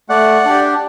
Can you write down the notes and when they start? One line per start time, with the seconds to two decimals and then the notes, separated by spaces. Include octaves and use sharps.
0.09 A3 D5 F#5
0.45 D4 G4